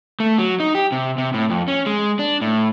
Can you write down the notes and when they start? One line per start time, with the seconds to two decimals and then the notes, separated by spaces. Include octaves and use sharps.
0.20 A3
0.38 F#3
0.60 D#4
0.75 G4
0.92 C3
1.18 C3
1.34 A2
1.50 F2
1.68 C#4
1.86 G#3
2.19 D4
2.41 A2